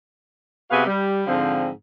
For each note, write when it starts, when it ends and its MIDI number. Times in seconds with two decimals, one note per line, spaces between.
0.71 0.85 48
0.71 0.85 59
0.71 0.85 66
0.71 0.85 68
0.71 0.85 71
0.71 0.85 77
0.87 1.23 55
1.27 1.70 44
1.27 1.70 50
1.27 1.70 53
1.27 1.70 60